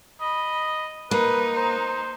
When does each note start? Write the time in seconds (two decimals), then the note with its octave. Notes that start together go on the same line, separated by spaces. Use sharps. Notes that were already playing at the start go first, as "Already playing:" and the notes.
0.21 D#5 B5
1.11 A#3 D#4 B4
1.56 C5